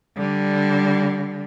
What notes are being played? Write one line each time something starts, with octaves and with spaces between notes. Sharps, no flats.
D3 G3